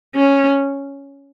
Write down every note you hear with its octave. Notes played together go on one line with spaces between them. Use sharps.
C#4